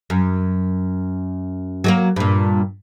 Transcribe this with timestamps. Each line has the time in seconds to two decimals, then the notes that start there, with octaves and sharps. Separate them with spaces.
0.10 F#2
1.84 F#3 G#3 A#3
2.16 G2 A#2